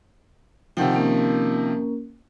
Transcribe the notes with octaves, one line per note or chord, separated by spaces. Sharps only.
C3 D#3 F3 F#5 G5
A#3 C#4 A#4